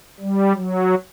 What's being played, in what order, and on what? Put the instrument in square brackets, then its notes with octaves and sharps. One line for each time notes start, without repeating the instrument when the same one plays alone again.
[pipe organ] G3
F#3